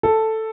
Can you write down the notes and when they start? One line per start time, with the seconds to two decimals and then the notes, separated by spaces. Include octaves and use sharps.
0.03 A4